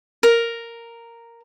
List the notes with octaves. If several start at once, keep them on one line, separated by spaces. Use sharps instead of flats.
A#4